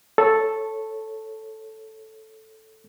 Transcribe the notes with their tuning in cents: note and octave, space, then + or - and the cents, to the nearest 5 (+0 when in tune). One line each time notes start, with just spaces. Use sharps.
A4 +0 C#5 -10